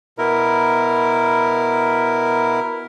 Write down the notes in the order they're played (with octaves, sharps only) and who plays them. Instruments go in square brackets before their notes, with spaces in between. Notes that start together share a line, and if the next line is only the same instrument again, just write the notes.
[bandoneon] B2 E4 A#4